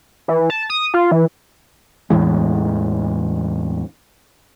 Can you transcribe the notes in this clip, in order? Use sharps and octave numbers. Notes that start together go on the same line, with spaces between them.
E3
A5
D#6
F4
E3
E2 A2 E3 G#3